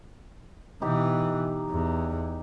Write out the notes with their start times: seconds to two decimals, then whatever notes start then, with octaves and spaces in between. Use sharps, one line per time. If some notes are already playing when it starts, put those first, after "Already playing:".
0.82 B2 E3 D#4 G4
1.69 E2